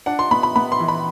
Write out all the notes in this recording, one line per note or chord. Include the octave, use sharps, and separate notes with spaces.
D4 F#5
C6
B3 B5
B5
B3 B5
C6
E3
B5